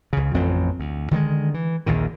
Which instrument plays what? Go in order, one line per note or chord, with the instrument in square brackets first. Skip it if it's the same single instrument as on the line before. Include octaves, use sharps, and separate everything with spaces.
[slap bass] C#2 C#3
A1 F2 C4
D2
D3 D#3 G3 G#3
E3
A#1 D#2 A#2 D#3